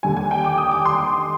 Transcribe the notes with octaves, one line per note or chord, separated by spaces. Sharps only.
D#2 D3 G3 G#5
G#5
G5
D6
D#6
D6
C6